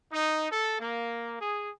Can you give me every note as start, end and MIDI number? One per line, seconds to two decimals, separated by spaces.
0.12 0.46 63
0.51 0.79 69
0.80 1.35 58
1.40 1.69 68